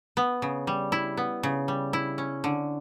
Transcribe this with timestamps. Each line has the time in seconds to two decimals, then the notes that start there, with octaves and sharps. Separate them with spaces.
0.17 B3
0.42 C#3
0.67 G3
0.92 E4
1.17 B3
1.43 C#3
1.68 G3
1.93 E4
2.18 C#4
2.44 D3